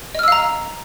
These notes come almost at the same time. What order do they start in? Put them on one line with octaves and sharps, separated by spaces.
D#5 F6 E6 F5 A#5